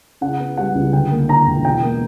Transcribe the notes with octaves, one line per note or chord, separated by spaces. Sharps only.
C#3 F#5
B3
G3 F#5
C#2
D2 G5
A#3
D3 A#5
E1
B2 G5
A#3